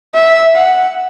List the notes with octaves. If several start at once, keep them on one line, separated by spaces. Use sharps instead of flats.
E5
F#5